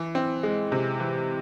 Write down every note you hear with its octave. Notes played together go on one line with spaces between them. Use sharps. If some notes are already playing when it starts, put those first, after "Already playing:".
Already playing: E3
C4
G#3
C3
E3